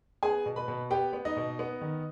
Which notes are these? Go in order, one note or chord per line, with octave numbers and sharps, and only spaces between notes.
B3 G#4 G#5
B2
B4 B5
B2
B3 G4 G5
B3
D#4 D#5
B2
B3
D#3